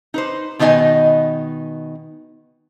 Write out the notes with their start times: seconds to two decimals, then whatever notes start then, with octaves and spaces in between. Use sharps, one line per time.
0.14 D#4 B4 C5
0.59 B2 D#3 B3 D#4 D#5 G#5